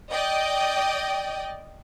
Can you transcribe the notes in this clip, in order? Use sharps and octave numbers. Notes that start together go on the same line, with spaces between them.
D5 D#5 G5